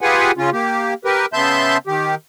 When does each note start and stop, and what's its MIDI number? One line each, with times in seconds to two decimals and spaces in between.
0.01 0.31 65
0.01 0.31 67
0.01 0.31 68
0.01 0.31 71
0.01 0.31 78
0.01 0.31 80
0.37 0.50 49
0.37 0.50 61
0.37 0.50 65
0.53 0.94 58
0.53 0.94 67
1.05 1.26 67
1.05 1.26 70
1.05 1.26 71
1.33 1.77 49
1.33 1.77 59
1.33 1.77 76
1.33 1.77 81
1.33 1.77 84
1.33 1.77 91
1.87 2.15 51
1.87 2.15 67